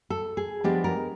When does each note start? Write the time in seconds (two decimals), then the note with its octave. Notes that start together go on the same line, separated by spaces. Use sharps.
0.10 A4
0.37 G#4
0.64 F3 G#3 B3 D4 G4
0.84 A#4